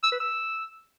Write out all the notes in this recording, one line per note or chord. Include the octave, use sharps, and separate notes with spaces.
E6
B4
E6